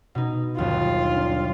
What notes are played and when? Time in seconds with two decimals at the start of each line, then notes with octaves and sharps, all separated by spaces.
0.15 B2 D#4
0.58 G1 D#2 F#3 F4
1.17 D4